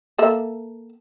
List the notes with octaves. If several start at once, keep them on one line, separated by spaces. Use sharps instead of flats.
A#3 A4 E5